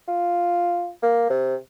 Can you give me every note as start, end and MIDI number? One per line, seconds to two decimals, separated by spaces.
0.08 0.90 65
1.03 1.27 58
1.30 1.55 48